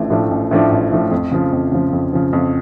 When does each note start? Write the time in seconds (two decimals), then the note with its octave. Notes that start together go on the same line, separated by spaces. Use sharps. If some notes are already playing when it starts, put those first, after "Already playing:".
Already playing: A1 A2 F3 A3 D4
0.10 A2 F3 A3 D4
0.31 A1
0.51 A2 F3 A3 D4
0.72 A1
0.92 A2 F3 A3 D4
1.11 F2
1.31 C#3 F3
1.53 F2
1.72 C#3 F3
1.93 F2
2.13 C#3 F3
2.33 F2